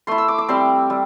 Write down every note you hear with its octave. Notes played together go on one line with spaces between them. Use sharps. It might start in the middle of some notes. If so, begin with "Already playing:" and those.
A3 E4 C6
E6
D6
D6
G3 C4 E4 C6
G3